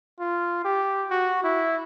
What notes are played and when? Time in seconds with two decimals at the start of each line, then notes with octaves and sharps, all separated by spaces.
0.20 F4
0.64 G4
1.10 F#4
1.43 E4